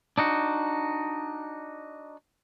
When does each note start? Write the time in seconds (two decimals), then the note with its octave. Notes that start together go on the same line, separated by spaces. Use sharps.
0.18 D4 D#4 F#4